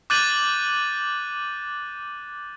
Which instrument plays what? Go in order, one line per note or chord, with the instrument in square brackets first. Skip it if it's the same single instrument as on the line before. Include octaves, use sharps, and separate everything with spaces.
[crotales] D6 F#6 G6 A6 D#7 F#7